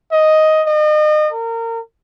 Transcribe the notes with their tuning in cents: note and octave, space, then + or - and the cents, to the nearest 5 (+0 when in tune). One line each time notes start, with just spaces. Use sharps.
D#5 +5
D#5 -35
A#4 -25